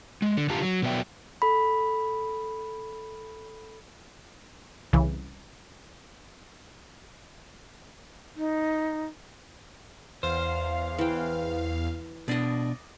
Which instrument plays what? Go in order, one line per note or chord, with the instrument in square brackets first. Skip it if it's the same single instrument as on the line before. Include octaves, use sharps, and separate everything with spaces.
[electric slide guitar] G#3
D3
D3 F4 G4 F5 A5 A#5
F#3
B2 F#3 B3 D5 E5 G5
[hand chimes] A4 B5
[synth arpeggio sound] C2 C#3 E3
[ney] D#4
[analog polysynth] E2 F5 [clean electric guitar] C5
[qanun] E3 G5
[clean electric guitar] B2 D4 [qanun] D5 D#5